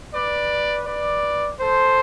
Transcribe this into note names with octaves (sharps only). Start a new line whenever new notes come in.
B4 D5
B4 D5
A4 C5